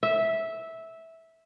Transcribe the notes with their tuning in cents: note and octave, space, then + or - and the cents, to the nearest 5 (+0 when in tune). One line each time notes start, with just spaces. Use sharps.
E5 -10